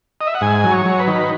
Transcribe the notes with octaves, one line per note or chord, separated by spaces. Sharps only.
D#5
E5
F#5
G#2 G#5
F#3
C#5
F#3
B4
D#3